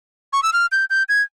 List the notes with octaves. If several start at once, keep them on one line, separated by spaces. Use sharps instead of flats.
C#6
E6
F6
G6
G6
G#6